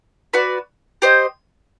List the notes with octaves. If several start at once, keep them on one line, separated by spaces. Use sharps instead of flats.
F#4 B4 D5
G4 C5 D#5